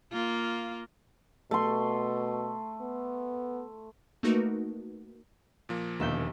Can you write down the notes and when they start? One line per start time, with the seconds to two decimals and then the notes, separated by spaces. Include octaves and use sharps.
0.12 A#3 F4
1.51 B2 A3 C6
2.81 B3
4.23 A3 A#3 D#4 F#4 A#4 B4
5.69 A#2 F3 A#3
6.00 E1 D#2 E5 G6